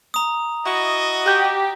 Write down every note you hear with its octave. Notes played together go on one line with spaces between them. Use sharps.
A#5 D#6
E4 F#4 D#5
G4 F#5 G6